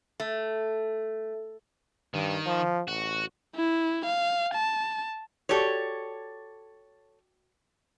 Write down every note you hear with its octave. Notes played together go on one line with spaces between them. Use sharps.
A3
G2 D#3
F3
A1 F#4
E4
F5
A5
F#4 G4 A4 C#5 D5